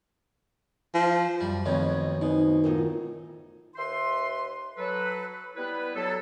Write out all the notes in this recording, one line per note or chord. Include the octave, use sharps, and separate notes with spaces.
F3
F#2 G3
F2 B2 D#3 A3 C4 C#5 D#5
B2 D#4 C5 G#5 D#6
D2 A2 D#4 F4 A#4
D#2 B4 E5 C6
F#3 A4 B4
G3 B3 E4 B4
F#3 A4